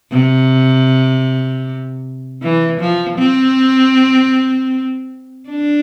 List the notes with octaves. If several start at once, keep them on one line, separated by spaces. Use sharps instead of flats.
C3
E3
F3
C4
D4